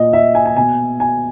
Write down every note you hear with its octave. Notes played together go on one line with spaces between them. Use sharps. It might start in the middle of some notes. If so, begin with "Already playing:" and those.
Already playing: A#2 D#5
E5
G#5
G#5
B2 G#5
G#5